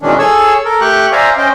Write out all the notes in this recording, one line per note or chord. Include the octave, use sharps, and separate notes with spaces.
B2 D#3 E3 G#3 C#4 D4
G#4 A4 C#5 G#5 E6
A4 A#4
A3 G4 G5 C#6 F#6
C5 D5 E5 F5 G#5 A#5
C#4 C5 D#5 G5